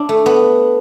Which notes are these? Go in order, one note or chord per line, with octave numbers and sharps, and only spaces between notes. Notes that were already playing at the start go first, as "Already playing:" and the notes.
Already playing: D4 E4
A3
B3